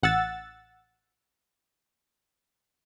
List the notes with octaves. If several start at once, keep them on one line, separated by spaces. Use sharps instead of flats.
A1 F#5 E6 A6